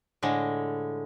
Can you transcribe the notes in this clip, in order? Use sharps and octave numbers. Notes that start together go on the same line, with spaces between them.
A2 D3 G#3